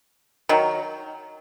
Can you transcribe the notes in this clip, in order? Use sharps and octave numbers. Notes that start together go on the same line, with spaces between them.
D#3 F#3